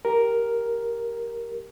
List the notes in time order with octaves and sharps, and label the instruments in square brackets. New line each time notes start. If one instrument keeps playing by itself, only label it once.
[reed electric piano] G4 A#4